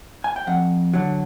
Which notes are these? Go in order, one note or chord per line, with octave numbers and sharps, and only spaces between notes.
G#5
G5
F2 F#5
D3 F#3